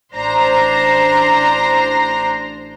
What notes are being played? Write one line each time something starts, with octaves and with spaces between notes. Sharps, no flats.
A1 D4 C5 A#5 A#6 C7